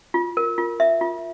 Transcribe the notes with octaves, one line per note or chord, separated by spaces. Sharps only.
F4
A#4
F4
E5
F4